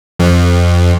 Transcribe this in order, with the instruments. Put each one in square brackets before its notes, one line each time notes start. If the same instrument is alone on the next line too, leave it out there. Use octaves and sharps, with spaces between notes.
[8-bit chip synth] F2